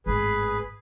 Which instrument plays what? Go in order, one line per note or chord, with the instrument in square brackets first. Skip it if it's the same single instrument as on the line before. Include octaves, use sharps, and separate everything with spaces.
[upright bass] G#1 A2 [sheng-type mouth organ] G#4 B4